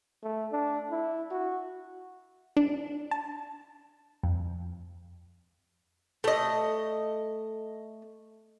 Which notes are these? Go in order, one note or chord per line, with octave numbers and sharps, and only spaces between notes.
A3
D4
E4
F#4
D4
A5
F2
A3 D#5